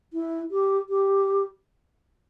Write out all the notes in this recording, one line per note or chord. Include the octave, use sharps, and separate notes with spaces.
E4
G4
G4